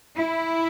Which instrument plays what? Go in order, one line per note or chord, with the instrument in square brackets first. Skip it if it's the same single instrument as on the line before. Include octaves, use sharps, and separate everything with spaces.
[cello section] E4